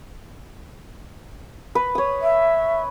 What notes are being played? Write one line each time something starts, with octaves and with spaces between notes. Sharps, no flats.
B4
C#5 D#6
E5